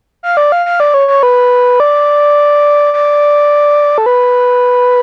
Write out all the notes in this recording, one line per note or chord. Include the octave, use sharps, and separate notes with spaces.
F5
D5
F5
F5
D5
C#5
C#5
B4
D5
D5
A4
B4